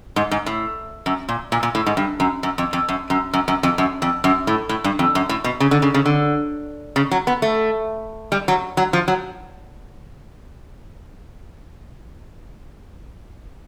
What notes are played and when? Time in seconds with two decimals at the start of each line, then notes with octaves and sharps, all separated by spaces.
0.16 G#2
0.31 G#2
0.46 A2
1.06 F#2
1.29 A#2
1.52 A#2
1.63 A#2
1.75 A2
1.86 G#2
1.97 G2
2.20 F#2
2.43 F#2
2.58 F2
2.73 F2
2.89 F#2
3.10 F#2
3.34 F#2
3.48 F#2
3.63 F2
3.78 F#2
4.02 F2
4.24 F#2
4.47 A2
4.69 A2
4.84 G2
4.99 F2
5.15 F#2
5.29 A2
5.44 B2
5.60 C#3
5.71 D3
5.82 C#3
5.94 C#3
6.06 D3
6.96 C#3
7.11 F#3
7.27 B3
7.42 A3
8.32 G3
8.48 F#3
8.77 F#3
8.93 F3
9.08 F#3